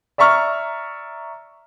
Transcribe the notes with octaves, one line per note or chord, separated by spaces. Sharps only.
D5 E5 A#5 C#6 F6